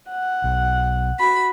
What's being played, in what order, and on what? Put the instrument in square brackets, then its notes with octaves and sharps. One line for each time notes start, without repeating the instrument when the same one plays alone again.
[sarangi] F#5
[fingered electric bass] B1
[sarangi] F#4 [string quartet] B5